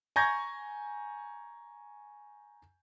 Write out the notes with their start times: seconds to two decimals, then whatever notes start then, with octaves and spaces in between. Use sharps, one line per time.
0.16 G#5 A#5 C#6 G6 G#6 A#6